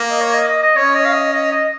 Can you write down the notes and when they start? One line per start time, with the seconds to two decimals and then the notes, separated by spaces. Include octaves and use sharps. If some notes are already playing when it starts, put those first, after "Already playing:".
Already playing: A#3
0.10 D#5
0.20 C#5
0.34 D#5
0.48 D#5
0.62 D#5
0.76 C#4 C#5
0.95 D#5
1.06 F5
1.13 D#5
1.33 D#5
1.51 D#5